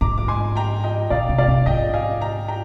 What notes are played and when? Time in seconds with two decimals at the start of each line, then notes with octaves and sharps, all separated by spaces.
0.01 G#2 A#5 D6
0.18 D6
0.28 G#5 C6
0.55 G5 A#5
0.84 D#5 G5
1.10 A#2 D5 F5
1.29 C3
1.38 D5 F5
1.48 C3
1.66 G#2 D#5 G5
1.94 F5 G#5
2.21 G5 A#5
2.48 G5 A#5